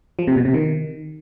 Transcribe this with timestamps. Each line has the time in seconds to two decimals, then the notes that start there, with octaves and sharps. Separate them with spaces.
0.19 F3
0.27 C3
0.36 B2
0.45 C3
0.54 D#3